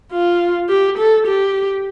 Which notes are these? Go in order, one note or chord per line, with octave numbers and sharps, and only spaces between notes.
F4
G4
A4
G4